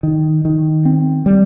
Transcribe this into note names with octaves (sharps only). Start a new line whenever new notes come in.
D#3
D#3
C4
G3